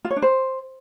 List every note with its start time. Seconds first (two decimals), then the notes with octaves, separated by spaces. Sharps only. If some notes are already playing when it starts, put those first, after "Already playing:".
0.05 F4
0.10 C#5
0.16 D4
0.22 C5